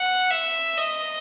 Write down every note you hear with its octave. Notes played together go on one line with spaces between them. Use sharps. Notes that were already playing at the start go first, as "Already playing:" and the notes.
Already playing: F#5
E5
D#5